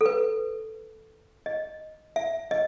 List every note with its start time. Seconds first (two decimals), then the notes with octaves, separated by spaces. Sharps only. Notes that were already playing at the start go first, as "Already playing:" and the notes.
0.01 A4
0.06 B4
1.46 D#5
2.16 E5
2.51 D#5